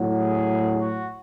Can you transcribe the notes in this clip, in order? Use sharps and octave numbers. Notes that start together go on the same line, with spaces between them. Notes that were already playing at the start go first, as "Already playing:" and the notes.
Already playing: A2 F#3
G#4
F#4